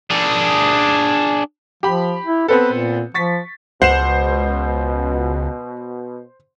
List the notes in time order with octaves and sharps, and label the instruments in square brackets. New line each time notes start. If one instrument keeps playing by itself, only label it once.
[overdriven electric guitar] D4 G#4
[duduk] F3 [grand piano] G4 B5
[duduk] E4
[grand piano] B3 C4 A4 [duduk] B4
[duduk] A#2
[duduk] F3 [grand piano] C#6 A6 B6
[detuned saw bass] C#2 [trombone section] B2 [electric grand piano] C5 C7 E7 [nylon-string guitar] F#5